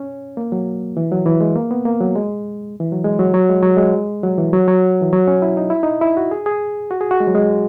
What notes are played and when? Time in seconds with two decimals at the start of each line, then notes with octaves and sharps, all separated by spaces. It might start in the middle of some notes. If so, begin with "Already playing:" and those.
Already playing: C#4
0.37 A#3
0.52 F#3
0.97 E3
1.12 F#3
1.26 E3
1.41 G#3
1.56 A#3
1.71 B3
1.85 A#3
2.00 F#3
2.15 G#3
2.80 E3
2.92 F#3
3.04 G#3
3.19 F#3
3.34 F#3
3.49 G#3
3.63 F#3
3.77 G#3
4.23 F#3
4.38 E3
4.53 F#3
4.68 F#3
5.02 E3
5.13 F#3
5.28 C#4
5.42 E4
5.57 D#4
5.70 E4
5.83 D#4
6.02 E4
6.17 F#4
6.31 G#4
6.46 G#4
6.91 F#4
7.01 G#4
7.11 F#4
7.20 G#3
7.27 F#3
7.35 G#3